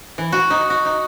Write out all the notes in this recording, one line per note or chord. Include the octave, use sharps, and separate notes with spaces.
E3
F#4
D#4
F#4
D#4